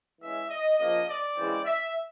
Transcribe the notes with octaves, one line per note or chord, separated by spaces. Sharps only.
E3 G#3 C#4 E5
D#5
C#3 F3 A#3 D#5
D5
C#3 E3 G#3 C4
E5